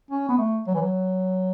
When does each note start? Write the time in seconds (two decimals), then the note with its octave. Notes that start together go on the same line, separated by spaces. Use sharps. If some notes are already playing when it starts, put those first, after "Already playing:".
0.11 C#4
0.29 B3
0.38 A3
0.67 F#3
0.74 E3
0.81 F#3